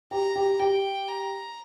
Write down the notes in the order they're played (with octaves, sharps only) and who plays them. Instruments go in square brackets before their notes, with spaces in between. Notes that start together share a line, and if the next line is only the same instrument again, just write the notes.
[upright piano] G4 [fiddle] A#5
[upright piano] G4
[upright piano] G4 [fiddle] G5
[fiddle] A#5